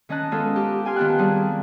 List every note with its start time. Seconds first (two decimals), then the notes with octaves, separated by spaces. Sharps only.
0.09 D#3 C#4 D#5 A5 F#6
0.31 G#3 B3 C#4 F4 A4 A#4
0.56 G4
0.85 G5 G#5 C6 F6
0.96 D#3 B3 F4 G5 A5 F#6
1.18 G3 C4 G#4